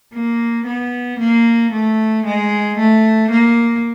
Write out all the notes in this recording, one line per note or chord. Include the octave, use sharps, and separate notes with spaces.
A#3
B3
A#3
A3
G#3
A3
A#3